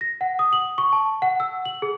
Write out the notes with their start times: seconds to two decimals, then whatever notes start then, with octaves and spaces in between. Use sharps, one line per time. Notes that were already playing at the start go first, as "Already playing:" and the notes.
0.01 A#6
0.21 F#5
0.39 D#6
0.53 F#7
0.78 C#6
0.93 A5
1.22 F#5
1.40 E6
1.65 F#7
1.82 G#4